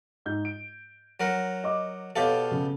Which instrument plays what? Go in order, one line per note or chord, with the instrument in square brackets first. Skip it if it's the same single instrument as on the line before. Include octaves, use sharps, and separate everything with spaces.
[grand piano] G#2 G6
D7
[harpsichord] F#3 A#4 F#5
[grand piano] D#5 D6
[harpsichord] B2 G4 A4 [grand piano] C#5 F5
[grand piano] C#3